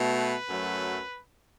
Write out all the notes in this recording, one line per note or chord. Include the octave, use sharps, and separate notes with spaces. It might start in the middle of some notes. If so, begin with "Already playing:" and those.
Already playing: B2 A3
B4
F#2 F#3 A3